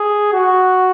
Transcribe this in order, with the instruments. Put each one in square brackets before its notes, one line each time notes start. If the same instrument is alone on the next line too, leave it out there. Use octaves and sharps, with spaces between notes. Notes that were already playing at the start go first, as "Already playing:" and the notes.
Already playing: [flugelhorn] G#4
F#4